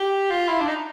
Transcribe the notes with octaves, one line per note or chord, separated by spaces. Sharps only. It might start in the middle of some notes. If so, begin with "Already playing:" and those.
Already playing: G4
F4
E4
D4
D#4